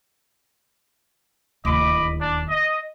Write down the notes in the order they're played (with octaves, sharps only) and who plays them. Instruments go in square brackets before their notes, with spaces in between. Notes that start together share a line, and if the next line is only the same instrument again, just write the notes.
[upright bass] D1 D#2 [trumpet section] D#5 B5 D6
[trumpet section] D4 D5
D#5